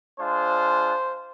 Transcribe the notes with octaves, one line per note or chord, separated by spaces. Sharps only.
G#3 D4 F4 C5